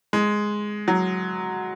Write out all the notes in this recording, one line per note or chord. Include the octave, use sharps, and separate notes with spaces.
G#3
F#3